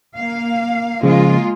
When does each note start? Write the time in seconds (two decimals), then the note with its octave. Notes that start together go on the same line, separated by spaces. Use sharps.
0.15 A#3 F5
1.03 C#3 F3 G#3 A#3 F4